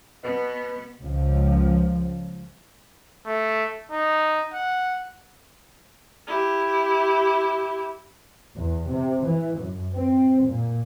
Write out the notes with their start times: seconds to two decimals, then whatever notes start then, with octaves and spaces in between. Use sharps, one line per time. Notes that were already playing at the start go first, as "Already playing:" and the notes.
0.24 B2 B3
1.01 C#2 F3
3.26 A3
3.91 D#4
4.54 F#5
6.27 E4 G4
8.56 E2
8.90 C3
9.27 E3
9.59 F#2
9.96 C4
10.46 A#2